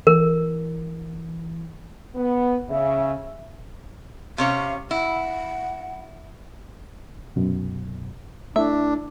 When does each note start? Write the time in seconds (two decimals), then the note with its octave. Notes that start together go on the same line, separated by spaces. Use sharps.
0.07 E3 A#4
2.15 B3
2.70 C#3 E5
4.38 C3 C#4 C#5 F5
4.91 E4 F#5
7.36 C2 F#2 B2
8.56 A3 D4 E4 E5